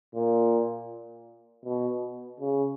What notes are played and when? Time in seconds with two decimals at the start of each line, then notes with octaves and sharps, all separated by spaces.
0.15 A#2
1.65 B2
2.40 C#3